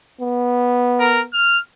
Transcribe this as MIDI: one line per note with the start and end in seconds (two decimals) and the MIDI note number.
0.20 1.29 59
1.00 1.21 70
1.33 1.59 89